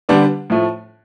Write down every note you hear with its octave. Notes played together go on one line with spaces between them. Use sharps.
D3 G3 B3 D4
A2 F3 A3